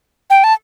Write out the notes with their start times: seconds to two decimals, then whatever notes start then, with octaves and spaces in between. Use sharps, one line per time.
0.30 G5
0.44 A5